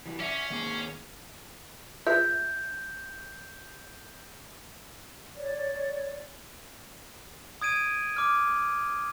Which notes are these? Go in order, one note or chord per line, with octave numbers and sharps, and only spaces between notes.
E3 G3
C#4 D5 E5
D#3 A#3 G#4
F4 G#4 B4 E5 G6
C#5 D5
D#6 G#6 D7 D#7
D6 F6